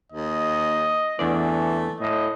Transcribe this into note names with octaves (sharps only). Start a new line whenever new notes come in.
D#2 D#5
E2 E3 A3 D4 D5
A2 D#5